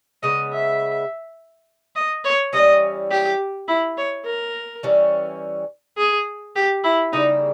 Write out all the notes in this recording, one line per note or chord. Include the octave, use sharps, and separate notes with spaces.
C#3 G#3 B3 D#5
E5
D#5
C#5
E3 G3 C#4 D#5
G4
E4
C#5
A#4
E3 G3 C#4
G#4
G4
E4
C#3 G3 A#3 D#4 E4